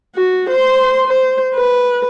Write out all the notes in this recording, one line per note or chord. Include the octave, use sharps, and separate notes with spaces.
F#4
C5 C6
C5
B4